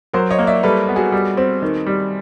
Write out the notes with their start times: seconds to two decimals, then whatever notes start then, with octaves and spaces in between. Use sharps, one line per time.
0.13 F#3 A#4 C5
0.30 C#5 D#5
0.39 A#3
0.47 D5 E5
0.63 G3 A4 B4
0.88 B3
0.96 F#4 G#4
1.12 G3
1.37 C4
1.62 D#3
1.86 G3